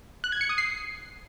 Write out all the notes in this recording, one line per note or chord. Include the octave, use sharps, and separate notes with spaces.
F#6
G#6
C#7
D#6
C7